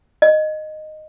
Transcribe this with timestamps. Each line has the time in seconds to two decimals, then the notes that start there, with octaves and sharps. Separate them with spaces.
0.22 D#5